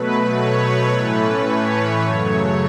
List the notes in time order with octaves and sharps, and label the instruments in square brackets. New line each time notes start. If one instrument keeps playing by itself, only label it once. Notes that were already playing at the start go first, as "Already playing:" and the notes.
Already playing: [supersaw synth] B2 F#3 A3 B4
C#5
A2 E3 A3 C#4 B4
C#5
F#2 C#3 F#3 A3 C#5